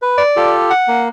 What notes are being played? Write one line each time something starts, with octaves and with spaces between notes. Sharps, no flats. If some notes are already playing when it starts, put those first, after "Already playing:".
B4
D5
F4 G4 A4
F#5
A#3